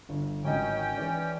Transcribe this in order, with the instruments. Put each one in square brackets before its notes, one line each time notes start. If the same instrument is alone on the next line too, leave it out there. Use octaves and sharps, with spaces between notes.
[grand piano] G1
[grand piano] G#1 D#5 [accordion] C#4 G5
[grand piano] E3 G#4 D5